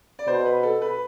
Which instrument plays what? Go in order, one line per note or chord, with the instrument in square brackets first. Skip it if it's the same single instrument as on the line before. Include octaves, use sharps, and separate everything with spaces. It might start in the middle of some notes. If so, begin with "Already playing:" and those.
[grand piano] D5
[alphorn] B2 [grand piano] C5
[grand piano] B4
A4
B4